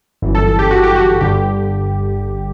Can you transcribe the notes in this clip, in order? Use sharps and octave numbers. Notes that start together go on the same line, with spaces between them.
G1 F#2 E3
A4
A4
G4
F#4
G4
F#4
G1 G2 D3 G4